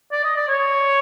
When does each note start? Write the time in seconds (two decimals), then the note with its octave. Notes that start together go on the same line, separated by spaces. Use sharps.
0.11 D5
0.24 D#5
0.36 D5
0.48 C#5